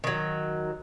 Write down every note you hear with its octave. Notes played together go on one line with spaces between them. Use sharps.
D#3 F#3